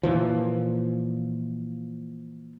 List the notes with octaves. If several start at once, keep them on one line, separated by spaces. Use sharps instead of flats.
A#2 E3 F3